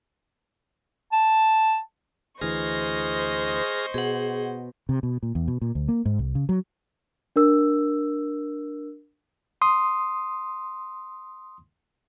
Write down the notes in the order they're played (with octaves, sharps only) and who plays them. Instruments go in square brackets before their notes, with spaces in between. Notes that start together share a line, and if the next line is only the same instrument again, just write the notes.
[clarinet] A5
[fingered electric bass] D2 E3 [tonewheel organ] G#4 F6 A#6 [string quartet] C5 D#5 C#6
[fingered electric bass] B2 [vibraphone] G#4 F#5
[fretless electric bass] C3
B2
A#2
E2
B2
A#2
D2
A#3
G#2
C2
C#3
F#3
[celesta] D4 A#4 E6
[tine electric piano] C6 D#6